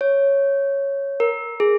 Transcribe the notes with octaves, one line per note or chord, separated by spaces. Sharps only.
C#5
A#4
G#4